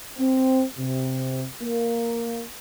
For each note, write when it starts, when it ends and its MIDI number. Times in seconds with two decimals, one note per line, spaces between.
0.18 0.64 60
0.78 1.44 48
1.61 2.43 58